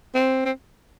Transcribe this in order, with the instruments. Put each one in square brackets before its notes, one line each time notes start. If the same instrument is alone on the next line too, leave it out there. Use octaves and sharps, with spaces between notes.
[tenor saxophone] C4
C4